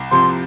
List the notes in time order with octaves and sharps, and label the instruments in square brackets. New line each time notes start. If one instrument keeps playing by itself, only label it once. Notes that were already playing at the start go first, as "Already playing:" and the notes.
Already playing: [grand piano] C2
[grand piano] C3 F3 [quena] C6